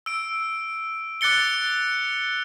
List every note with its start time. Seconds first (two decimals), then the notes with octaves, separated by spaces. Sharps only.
0.06 E6 D7
1.21 D6 F#6 A6 C#7 G7